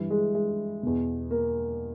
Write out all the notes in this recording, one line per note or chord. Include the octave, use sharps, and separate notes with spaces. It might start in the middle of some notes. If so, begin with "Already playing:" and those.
Already playing: G2 E3
G#3
G#3
E2 B2
A#3